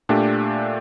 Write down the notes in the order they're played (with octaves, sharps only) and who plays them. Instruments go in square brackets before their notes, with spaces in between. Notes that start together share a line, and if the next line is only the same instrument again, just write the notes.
[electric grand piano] A#2 A3 D4 G4